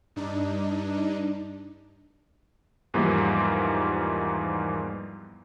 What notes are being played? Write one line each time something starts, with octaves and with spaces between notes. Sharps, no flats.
G2 D4 D#4
E2 G#2 E3 F3 G3 A#3